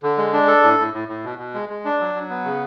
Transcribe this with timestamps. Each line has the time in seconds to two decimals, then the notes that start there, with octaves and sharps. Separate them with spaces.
0.03 D3
0.18 G#3
0.33 D4
0.47 A4
0.63 A2
0.79 A2
0.94 A2
1.08 A2
1.24 B2
1.38 B2
1.54 G#3
1.69 G#3
1.85 D4
2.00 F#3
2.15 F#3
2.30 B3
2.45 C#3